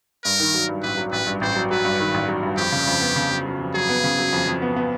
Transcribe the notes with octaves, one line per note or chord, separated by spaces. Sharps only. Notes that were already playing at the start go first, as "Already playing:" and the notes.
G2 A#4
D#3
F#3
G2
A1 B4
F#3
A1 B4
G2
A1 C5
F#3
F#3 B4
G2
D#3
A1
F#3
G2
F2 G4
C#3
F2
B3
C#3
F#3
F#3
F2
F#3 G#4
B3
C#3
F#3
F2
F2
B3
B3